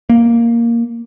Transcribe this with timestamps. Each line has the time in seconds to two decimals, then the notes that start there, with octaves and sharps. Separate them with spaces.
0.09 A#3